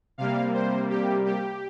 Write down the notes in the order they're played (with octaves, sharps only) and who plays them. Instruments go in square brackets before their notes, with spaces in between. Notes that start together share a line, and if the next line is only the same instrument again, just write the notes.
[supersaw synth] C3 G3 A#3 F5
C5
G4
G4